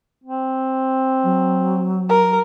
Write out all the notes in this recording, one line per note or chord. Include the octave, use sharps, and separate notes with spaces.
C4
F#3
A#4